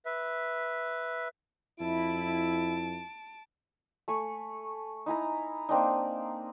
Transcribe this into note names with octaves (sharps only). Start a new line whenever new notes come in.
B4 E5
F2 E4 A5 D7
A3 G#5 C#6
D#4 E4 G#5 A#5
A#3 C4 D4 D#4